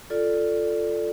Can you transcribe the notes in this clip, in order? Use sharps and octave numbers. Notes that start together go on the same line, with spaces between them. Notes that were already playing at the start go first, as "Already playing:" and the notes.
F4 A4 D5